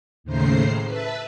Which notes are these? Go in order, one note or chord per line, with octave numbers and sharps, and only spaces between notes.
D#2 A2 C#3 C5 A#5 C7
B4 E5 A5